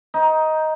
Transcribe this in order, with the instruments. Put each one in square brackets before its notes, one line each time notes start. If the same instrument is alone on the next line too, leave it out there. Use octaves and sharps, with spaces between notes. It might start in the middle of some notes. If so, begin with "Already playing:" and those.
[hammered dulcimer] D#4